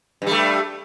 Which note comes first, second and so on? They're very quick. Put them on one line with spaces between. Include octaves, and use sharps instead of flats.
G2 G3 A3